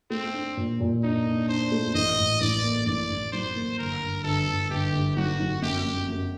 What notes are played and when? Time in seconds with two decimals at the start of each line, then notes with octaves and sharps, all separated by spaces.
0.10 A3 C4
0.34 D4
0.57 A#2
0.80 A#2
1.03 D4 D#4
1.26 D4
1.49 D4 C5
1.72 A3
1.94 A1 D#5
2.18 A2
2.41 A1 D5
2.63 A#3
2.86 A1 D5
3.10 A1
3.32 F#3 C5
3.55 A#3
3.78 G1 A#4
4.01 G1
4.24 G1 A4
4.47 G1
4.70 G1 G4
4.93 G1
5.17 F#3 F#4
5.40 F#3
5.62 F#2 G4
5.85 F#2
6.08 F#2